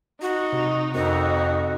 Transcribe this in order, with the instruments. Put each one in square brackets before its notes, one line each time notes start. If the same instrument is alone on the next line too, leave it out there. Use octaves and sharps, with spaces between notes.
[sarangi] D#4 [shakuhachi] F#4
[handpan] C3
[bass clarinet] F2 [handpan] C4 A#4 D#5 [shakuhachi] D#4 [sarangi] F#4